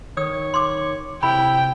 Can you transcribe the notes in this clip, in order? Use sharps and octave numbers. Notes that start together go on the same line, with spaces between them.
D#3 C#5 D#6
C6 D6
C3 E4 G5 B5